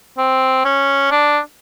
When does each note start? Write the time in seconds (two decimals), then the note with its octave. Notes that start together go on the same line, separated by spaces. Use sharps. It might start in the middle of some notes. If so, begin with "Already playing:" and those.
0.18 C4
0.65 C#4
1.11 D4